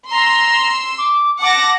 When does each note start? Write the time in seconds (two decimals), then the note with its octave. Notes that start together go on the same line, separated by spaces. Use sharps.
0.11 A#5 C6 E6
0.98 D6
1.42 F#5 A5 D6 A#6